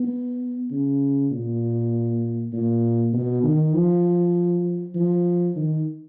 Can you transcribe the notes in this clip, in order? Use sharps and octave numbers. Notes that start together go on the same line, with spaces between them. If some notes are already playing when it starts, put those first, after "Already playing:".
Already playing: B3
C#3
A#2
A#2
B2
D#3
F3
F3
D#3